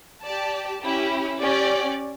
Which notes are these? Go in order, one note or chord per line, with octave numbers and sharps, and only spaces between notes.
G4 D5 A5
C#4 E4 G4
C#4 G4 D5